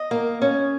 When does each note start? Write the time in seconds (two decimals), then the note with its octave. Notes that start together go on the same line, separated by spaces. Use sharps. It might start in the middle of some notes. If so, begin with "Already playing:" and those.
Already playing: D#5
0.11 A#3
0.42 C#4